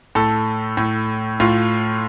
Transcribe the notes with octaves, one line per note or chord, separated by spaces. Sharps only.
A2 A4
A2
A2 F4